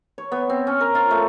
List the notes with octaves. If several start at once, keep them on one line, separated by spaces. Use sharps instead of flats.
C#5
B3
C4
C#4
A#4
F4
A3